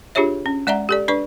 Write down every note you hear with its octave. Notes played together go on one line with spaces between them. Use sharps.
D4 F4 G4 G#4 C#5 E5
C#4
G#3 D5 E5 F#5 A#5
G4 A4 D5
D4 B4 D5 C#6